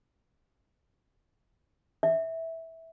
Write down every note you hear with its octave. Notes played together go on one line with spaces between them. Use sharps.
E5